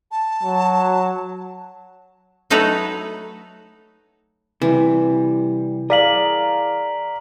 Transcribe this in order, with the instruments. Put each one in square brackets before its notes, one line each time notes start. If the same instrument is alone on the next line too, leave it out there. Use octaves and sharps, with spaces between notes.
[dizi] A5
[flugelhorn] F#3
[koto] F#3 A3 D#4 A4 B4 A#5
[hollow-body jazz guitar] C3 G3 [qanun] E3
[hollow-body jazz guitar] G#4 A#4 [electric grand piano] D5 F5 [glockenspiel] A#5 B6 F#7